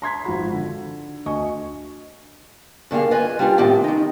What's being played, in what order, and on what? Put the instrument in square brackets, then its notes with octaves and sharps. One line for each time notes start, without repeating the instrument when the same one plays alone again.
[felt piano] A#5 C6 G#6 B6
G#1 F3 F#4 B5
D3
D2 D#5 G#5 C#6
[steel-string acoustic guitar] G2 D3 A#3 G#4 F5
F4 B4 D#5 G#5
G3 D4 F4
A2 D#3 C4 G4
D#3 D#4